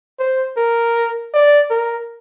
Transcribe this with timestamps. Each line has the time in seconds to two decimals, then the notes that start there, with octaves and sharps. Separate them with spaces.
0.19 C5
0.57 A#4
1.34 D5
1.71 A#4